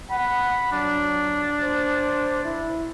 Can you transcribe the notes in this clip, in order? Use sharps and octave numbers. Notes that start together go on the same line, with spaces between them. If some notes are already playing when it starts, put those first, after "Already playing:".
F#5 B5
F#3 D4
C5
E4